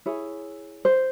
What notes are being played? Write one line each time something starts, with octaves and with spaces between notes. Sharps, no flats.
E4 G#4 C#5
C5